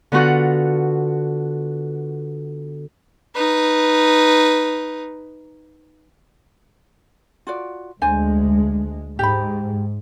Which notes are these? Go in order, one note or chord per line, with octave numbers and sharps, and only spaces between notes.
D3 B3 F4 F#4 F#6
D#4 B4
F4 F#4 D5
D2 G#3 D4 C5 G#5
G#2 G4 B5